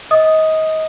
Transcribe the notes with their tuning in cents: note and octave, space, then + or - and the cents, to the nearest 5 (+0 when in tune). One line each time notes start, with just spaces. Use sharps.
D#5 +25 D#6 -5